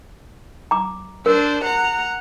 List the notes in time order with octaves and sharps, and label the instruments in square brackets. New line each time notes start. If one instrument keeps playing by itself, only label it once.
[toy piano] A#5 D6
[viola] D4 C5 [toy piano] A#4
[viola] F#5 A#5